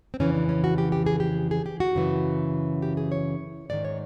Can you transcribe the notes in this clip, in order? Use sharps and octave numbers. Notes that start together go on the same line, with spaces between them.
C4
F2 C#3 E3 C#4
D4
C#4
F#4
G4
G4
G#4
G4
G#4
G4
F#4
F#2 C#3 E3
G4
G#4
C#5
G#2 D#3 D5
C#5